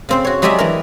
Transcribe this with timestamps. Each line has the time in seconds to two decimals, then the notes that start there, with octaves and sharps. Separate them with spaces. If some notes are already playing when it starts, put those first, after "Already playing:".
0.09 C#3 C4 C5
0.25 F#4 C#5
0.42 F#3 G#3 G4 G#4 D5 E5
0.58 E3 A#4